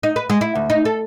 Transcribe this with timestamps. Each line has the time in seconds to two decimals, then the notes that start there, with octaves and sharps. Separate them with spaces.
0.03 D#4
0.16 B4
0.30 G#3
0.41 E4
0.55 D2
0.70 D#4
0.85 A4